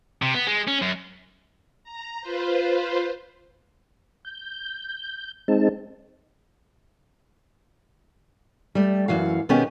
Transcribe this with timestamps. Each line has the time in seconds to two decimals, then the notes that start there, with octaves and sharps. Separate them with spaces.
0.22 C3
0.34 B3
0.47 G#3
0.68 C#4
0.82 F#2
1.84 A#5
2.22 F4 B4 C5
4.25 G6
5.48 G#3 C4 D#4 A5
8.75 G3 A3
9.08 F#2 E3 F#4 F5
9.49 B2 D#3 B3 C#4 G4 G#4